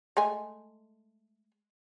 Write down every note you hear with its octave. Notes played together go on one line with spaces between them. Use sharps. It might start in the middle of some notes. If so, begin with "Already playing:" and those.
G#3 A3 G#5